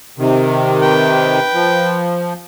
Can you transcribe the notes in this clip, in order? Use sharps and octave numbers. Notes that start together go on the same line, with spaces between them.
C3 D#3
B4 G5
F3